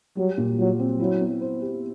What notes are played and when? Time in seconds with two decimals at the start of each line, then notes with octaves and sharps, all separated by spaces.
0.17 F#3 G3
0.37 A#2
0.58 F#3 F4
0.79 C4
1.00 F#3 E4
1.21 B3
1.41 C5
1.62 G4